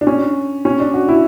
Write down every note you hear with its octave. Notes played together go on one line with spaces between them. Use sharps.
D4
C#4
C#4
D4
F#4
E4